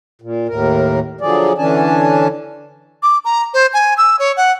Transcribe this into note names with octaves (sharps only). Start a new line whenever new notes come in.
A#2
D#2 A2 A#4
D3 F3 F#3 G#4 D5
D3 E3 C#4 D4 G#5 A5
D6
A#5
C5
G#5
E6
C#5
F#5